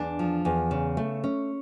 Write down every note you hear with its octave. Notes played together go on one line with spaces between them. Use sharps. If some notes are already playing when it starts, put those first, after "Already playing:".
Already playing: E2 D4
F3
E2
C#3
A3
C#4